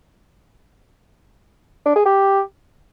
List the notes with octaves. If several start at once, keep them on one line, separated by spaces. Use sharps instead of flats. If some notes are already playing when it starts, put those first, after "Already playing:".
D4
G#4
G4